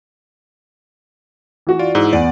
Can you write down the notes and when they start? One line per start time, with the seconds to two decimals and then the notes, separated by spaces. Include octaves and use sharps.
1.67 E3 F#4
1.79 F4 D5
1.95 G#2 E4
2.13 E2 B3 D5 F#5